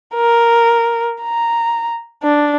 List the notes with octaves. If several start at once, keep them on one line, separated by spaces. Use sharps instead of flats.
A#4
A#5
D4